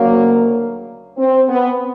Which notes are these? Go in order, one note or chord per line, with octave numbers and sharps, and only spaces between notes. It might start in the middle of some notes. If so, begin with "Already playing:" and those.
Already playing: D2 C#3 F#3 A#3
C4
B3